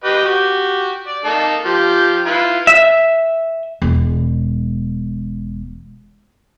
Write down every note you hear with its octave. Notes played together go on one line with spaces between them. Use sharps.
G4 B4 D#5
F#4 G4
D5
A#3 D#4 A4
F3 G4
E4 F4 B4
E5
E1 G#3